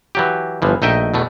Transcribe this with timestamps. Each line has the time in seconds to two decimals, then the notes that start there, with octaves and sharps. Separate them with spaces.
0.15 E3 F#3 G4
0.62 G1 E3 F3
0.82 A#1 A3 D#4 D#5 E5 G5
1.14 E2 B2 A3